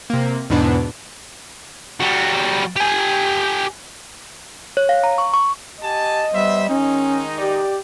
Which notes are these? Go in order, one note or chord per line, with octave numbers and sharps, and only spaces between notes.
C3 A#3
E2 G#2 B2 E3 B3 D4
G3 F#4
G4 G#5
C#5
F5
A#5
C#6
C#6
G4 D#5 G#5 A5
G3 B3 C5 E5
D#3 G#3 C#4 D#4
G4 D5